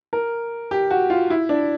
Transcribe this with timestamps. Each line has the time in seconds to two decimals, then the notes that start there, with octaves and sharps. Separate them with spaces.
0.13 A#4
0.71 G4
0.91 F#4
1.10 F4
1.30 E4
1.49 D4